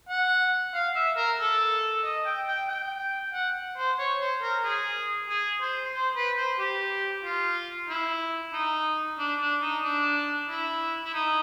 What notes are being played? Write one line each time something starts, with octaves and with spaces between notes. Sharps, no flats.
F#5
F5
E5
A#4
A4
D#5
G5
G5
G5
F#5
C5
C#5
C5
A#4
G#4
G#4
C5
C5
B4
C5
G4
F4
E4
D#4
D4
D4
D#4
D4
E4
E4
D#4